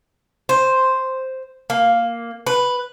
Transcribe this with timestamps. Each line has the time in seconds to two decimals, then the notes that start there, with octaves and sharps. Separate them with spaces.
0.49 C5
1.70 A#3
2.47 B4